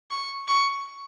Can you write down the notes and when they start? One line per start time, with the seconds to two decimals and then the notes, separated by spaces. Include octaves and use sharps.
0.11 C#6
0.48 C#6